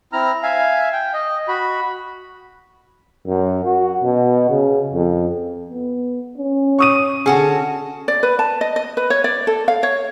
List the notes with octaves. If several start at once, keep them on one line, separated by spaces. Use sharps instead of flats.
C4 E4 A#5 F6
E5 F5 G#5
G5
D#5
F#4 B5
F#2
F#4
B2
C#3
F2
B3
C#4
C#6 D#6 D#7
D3 C#4 F#4 G#4 A4
D5
B4
A5
D#5
D#5
B4
C#5
D5
A4
F5
C#5